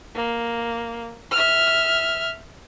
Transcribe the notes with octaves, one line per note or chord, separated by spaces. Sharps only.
A#3
E5 F6